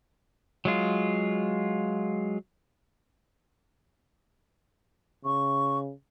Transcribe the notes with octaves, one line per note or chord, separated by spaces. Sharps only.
F#3 G#3 F4
C#3 C#6